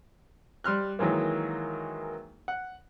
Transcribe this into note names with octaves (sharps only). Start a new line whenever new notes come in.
G3 C6 F6 F#6
D#3 E3 F#3 G#3 A#3
F#5